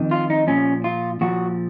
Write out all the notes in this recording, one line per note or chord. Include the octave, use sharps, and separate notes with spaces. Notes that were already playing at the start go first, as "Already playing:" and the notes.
Already playing: F2 D#3
F4
D#4
A#2 F3 C#4
F4
A#2 F3 F#4